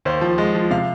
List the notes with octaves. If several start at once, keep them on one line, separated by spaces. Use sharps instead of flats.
D#2 C5
F3
G#3
F3
C3 F5